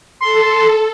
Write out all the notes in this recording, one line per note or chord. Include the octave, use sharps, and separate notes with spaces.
A4 C6